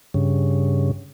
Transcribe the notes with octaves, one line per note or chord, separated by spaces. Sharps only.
G2 C#3